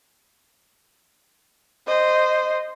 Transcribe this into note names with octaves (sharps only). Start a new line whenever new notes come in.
C5 D#5